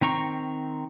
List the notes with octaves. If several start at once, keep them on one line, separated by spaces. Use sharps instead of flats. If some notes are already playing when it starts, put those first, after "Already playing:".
D#3 C4 A#5 C#6